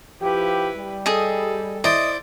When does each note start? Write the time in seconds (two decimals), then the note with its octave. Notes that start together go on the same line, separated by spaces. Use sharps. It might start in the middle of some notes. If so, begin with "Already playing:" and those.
0.21 F3 E4 G4 B4
0.76 G3
1.06 G#4 A4 D#5
1.84 E4 C5 D5 D#5